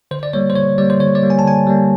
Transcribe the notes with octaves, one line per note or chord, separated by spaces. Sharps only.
D3 C5
D5
G3 A#3 C#5
C5
D3 C#5
G3 A#3 D5
C5
D3 C#5
D5
G3 A#3
G#5
A5
D3 G#5
G3 A#3